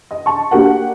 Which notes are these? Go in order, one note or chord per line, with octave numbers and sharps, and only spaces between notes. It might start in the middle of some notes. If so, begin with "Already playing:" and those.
D#5
A5 C#6
A#3 D4 G4 A#4 F#5